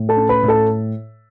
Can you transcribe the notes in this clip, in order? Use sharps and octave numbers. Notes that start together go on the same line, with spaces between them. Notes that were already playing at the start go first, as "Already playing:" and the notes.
Already playing: A2
A4 A5
C#4
B4 B5
A2
A4 A5